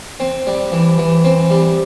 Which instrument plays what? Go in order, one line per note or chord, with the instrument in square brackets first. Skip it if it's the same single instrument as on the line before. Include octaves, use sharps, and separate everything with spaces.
[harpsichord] C4
G3
E3
E3
C4
G3